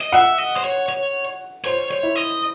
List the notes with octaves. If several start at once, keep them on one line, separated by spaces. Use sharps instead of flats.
D#5
E5 F#5
D#5
C5
C#5
C#5
C5 C#5
C#5
E4
D#5